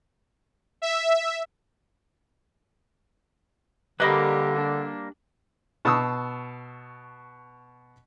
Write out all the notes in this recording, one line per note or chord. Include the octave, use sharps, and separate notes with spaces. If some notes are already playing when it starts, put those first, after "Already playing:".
E5
D3 G3 A#3 G4 A#4 B4 D#5 B5
D4
B2 A5 C#6 D#6 E6